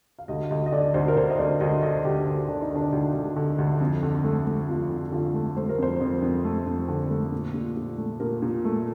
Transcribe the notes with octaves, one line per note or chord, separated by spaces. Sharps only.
F5
D2 D#5
D2 D#5
D#5
D3 D5
D2 C5
A#4
D2 C5
D#5
D2 D5
D2 D#5
D3 D#5
D2 G4
D2
D3 D4
D#4
D3 D4
D2
D2
D3
D2
F2
D3
A3
A3
F2 F4
D3
D3 F4
A3
A3 C5
A#4
F2 C5
F2
F2
A3
F2
D3
A3
A#2
A#2
A#2
A3
A#2 A#4
A#2
A3